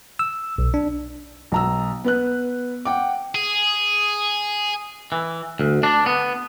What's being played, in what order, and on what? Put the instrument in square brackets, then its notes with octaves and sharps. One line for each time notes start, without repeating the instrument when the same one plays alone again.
[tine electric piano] E6
B1
D4
[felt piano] B1 A#5 E6
B3 B4 F#6
F#5 G5 D6
[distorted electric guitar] G#4
[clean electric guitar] E3
D2
D4
B3